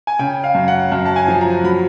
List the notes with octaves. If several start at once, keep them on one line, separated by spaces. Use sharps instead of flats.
G#5
C#3 G5
F5
F#2
F#5
F#2
A5
G#5
F3
A#5
F#3 B5